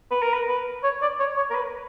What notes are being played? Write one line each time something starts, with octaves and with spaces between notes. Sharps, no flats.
B4
A#4
B4
B4
C#5
D5
C#5
C#5
A#4
B4